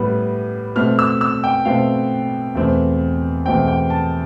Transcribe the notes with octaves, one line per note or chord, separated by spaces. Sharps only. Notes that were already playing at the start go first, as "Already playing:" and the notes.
Already playing: A2 G3 B3
B2 A3 C4 F6
E6
E6
G5
B2 A3 C4 F5
E2 B2 A3 C4
E2 B2 A3 C4 G5
G5
A5